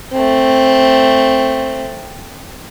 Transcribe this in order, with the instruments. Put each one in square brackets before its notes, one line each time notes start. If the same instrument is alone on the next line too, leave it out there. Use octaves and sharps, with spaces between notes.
[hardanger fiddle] A3 C4